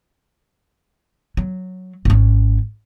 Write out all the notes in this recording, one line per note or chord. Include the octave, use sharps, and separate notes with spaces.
F#3
G#1 C#4